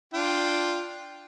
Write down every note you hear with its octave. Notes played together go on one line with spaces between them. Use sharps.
D4 F4 G5